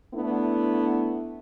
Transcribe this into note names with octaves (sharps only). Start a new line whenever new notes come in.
A3 B3 D4 E4